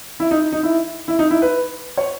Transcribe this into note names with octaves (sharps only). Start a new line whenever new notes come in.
E4
D#4
D#4
E4
E4
D#4
E4
B4
C#5